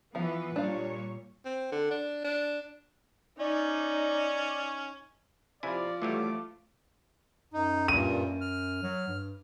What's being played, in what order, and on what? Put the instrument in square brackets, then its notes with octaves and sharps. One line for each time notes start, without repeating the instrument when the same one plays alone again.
[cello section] E3 B3 B4 [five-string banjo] F3 F5
[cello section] A#2 G3 C#5 [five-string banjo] D4 F5
[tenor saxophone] C4
D3
D4
D4
[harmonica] C#4 [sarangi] D#4 [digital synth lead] D5
[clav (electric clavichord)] C3 E4 G#5 [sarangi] F3 [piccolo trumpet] D5
[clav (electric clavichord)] E3 F#3 G3 [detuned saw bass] A3 [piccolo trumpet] D6
[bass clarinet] F#2 [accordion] D#4
[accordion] G2 A#2 [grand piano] D#7
[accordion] F6
[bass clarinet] F#3
G2